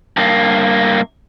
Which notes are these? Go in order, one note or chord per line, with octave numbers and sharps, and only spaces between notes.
G2 A#3